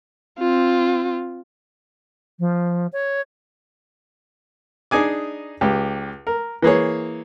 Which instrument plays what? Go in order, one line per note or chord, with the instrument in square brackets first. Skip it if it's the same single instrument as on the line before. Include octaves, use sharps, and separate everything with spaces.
[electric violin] C4 F4
[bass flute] F3
C#5
[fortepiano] D4 D#4 G#4 G#5 D6
C#2 G4
A#4
E3 A#3 G#4 C#5